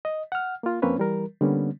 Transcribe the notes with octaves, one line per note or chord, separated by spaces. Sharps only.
D#5
F#5 F6
A#3 F4
F2 A#3 C4 C#4 B4 C#5
E3 G3 A#4
D3 G3 A#3 B3 C#4